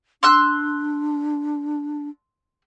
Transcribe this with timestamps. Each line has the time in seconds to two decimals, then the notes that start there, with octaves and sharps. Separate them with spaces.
0.23 D4 C6 E6 F#6